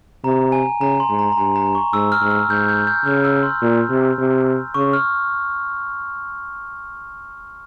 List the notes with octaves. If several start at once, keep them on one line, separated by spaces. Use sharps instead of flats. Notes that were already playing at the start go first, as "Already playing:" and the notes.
C3 A#5
G#5
C#3 A#5
C6
G#2
A#5
A#5
G2 G#5
A#5
C#6
G#2 E6
F6
G#2
E6
G#2 G6
G6
G6
C#3 F6
E6
C6
A#2
C3
C3
C#3 C#6
F6